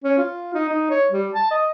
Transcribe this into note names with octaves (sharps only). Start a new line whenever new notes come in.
C#4
F4
D#4
D#4
C#5
G3
A5
D#5